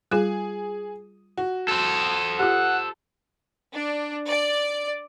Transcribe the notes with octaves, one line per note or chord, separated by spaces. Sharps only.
G3 F4 G#4
F#4
A4 C5
F4 G4 F#5
D4
D5